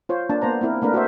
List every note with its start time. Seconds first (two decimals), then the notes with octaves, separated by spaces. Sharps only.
0.09 F4 C5 C#5
0.29 A#3 D4 A5
0.41 A#3 B3 C5 A#5
0.61 A#3 C4 E4 A#4
0.82 A3 A#3 D4 A#4 B4
0.94 F#4 A4 A#4 C5 E5